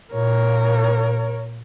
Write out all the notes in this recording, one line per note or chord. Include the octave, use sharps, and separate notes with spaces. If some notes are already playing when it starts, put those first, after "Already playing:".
A#2 A#4 C#5